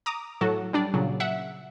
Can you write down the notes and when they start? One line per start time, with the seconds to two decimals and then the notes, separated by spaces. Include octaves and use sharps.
0.06 A#5 D6 D#6
0.41 A2 F#3 F#4 A4
0.73 G3 D4 D5
0.94 A#2 C#3 F#3
1.20 E5 F#5